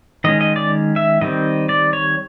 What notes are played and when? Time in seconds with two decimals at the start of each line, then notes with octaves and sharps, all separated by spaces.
0.24 D#3 G#3 C#4 D#5
0.41 D#5
0.56 D5
0.96 E5
1.21 D#3 G3 C4 D#5
1.69 D5
1.93 C#5